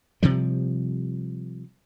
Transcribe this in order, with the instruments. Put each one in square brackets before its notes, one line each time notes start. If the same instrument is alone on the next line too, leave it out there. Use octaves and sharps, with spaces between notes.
[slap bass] C3 F3 G3